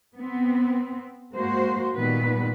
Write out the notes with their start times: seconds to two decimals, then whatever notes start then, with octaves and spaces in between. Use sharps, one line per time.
0.16 B3 C4
1.33 G#3 A#3 F#4 C5
1.95 A#2 D#3 G3 B3 B4